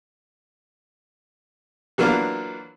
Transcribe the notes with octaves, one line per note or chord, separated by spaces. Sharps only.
E3 F#3 A#3 D4 F4